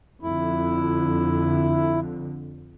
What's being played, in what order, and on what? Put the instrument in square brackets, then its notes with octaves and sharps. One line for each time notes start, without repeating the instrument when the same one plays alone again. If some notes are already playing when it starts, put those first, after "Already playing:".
[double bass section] F2 D3 [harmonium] E4